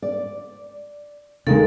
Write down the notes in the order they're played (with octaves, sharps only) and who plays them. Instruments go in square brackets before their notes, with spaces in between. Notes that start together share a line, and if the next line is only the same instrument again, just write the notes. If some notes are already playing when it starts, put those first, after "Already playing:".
[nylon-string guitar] D5
[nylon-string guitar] D#2 D#4 [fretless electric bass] C#3 G#3 [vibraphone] A4